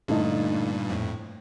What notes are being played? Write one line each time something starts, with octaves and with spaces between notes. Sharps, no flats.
G2 A#2 D3 A3 D#4
F2 A2